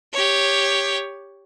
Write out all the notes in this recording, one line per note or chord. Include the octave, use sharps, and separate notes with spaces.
G4 C#5